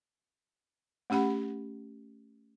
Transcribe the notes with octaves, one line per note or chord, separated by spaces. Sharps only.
A3 C#4 G4 F#5 B5